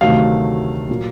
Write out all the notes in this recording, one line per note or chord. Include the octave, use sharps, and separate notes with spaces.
D2 C3 D#3 F#3 A3 F5
A#2 F#3 A#3